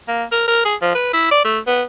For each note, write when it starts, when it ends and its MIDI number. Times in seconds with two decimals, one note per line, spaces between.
0.08 0.24 58
0.32 0.46 70
0.48 0.62 70
0.65 0.75 68
0.82 0.94 53
0.95 1.11 71
1.13 1.29 64
1.31 1.43 74
1.44 1.59 57
1.67 1.83 59